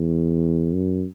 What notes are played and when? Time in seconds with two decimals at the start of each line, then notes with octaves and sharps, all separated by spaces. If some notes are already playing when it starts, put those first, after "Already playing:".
Already playing: E2
0.74 F#2